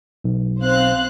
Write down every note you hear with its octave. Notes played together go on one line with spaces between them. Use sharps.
B1
C4 C5 F5 F#6